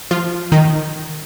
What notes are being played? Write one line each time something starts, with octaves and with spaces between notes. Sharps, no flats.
F3 F4
D#3 D#4